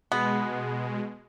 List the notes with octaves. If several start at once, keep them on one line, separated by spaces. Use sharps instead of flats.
B2 G#3 B3